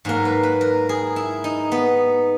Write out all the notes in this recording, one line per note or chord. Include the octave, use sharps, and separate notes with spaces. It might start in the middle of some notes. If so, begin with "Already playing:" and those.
G#2 F#3 A#3 A#4
B4
B4
A#4
G#4
E4
D#4
B3